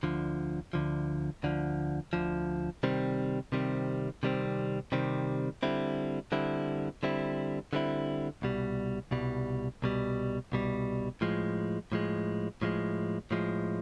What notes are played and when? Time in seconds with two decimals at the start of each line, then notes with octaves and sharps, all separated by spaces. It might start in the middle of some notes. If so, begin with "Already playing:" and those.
0.03 D2 D3 F3
0.73 D2 D3 F3
1.43 D2 D3 F3
2.13 D2 D3 F3
2.83 C3 D#3 G3 C4
3.52 C3 D#3 G3 C4
4.23 C3 D#3 G3 C4
4.92 C3 D#3 G3 C4
5.63 D3 G3 C4 E4
6.32 D3 G3 C4 E4
7.03 D3 G3 C4 E4
7.73 D3 G3 C4 E4
8.42 C2 B2 G3
9.11 C2 B2 G3
9.82 C2 B2 G3
10.52 C2 B2 G3
11.21 A2 F3 G#3
11.92 A2 F3 G#3
12.62 A2 F3 G#3
13.31 A2 F3 G#3